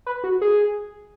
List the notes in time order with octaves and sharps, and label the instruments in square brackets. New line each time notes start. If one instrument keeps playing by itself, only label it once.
[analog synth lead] B4
F#4
G#4